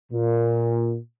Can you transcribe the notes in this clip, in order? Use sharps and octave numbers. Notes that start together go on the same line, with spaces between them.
A#2